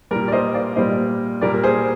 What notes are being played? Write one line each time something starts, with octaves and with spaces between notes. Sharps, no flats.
A#2 G3 A#4 D5
D5
C5 D#5
D5 F5
A#2 G3 C5 D#5
A#2 G3 A#4 D5
A#4
G#4 C5